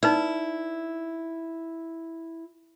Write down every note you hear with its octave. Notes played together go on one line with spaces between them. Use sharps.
D#4 E4 B4 D5